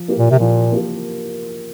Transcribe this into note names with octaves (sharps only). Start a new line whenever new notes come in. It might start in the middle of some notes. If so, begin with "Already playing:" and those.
Already playing: F3
A#3 G4 A#4
A#2
C3
A#2 F3
A#3 G4 A#4